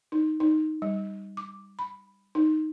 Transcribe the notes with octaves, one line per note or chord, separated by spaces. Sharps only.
D#4
D#4
G3
D6
B5
D#4